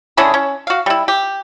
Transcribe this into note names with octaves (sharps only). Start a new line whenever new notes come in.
D3 C#4 E4 G#4
C#4
F#4 F5
G3 E4
G4